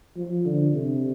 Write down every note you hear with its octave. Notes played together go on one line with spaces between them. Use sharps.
F3
D3
C3